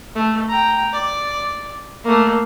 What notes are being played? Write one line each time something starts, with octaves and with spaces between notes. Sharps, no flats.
A3
G5 A#5
D5
A3 A#3